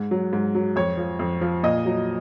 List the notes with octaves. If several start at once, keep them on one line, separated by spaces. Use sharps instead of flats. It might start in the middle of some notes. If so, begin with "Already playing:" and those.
Already playing: G#2
F#3
G#2
F#3
F2 C#5
F3
F2
F3
A#2 D#5
F#3